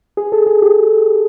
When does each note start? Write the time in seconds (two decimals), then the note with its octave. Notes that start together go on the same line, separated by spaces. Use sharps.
0.17 G#4
0.32 A4
0.47 G#4
0.62 G4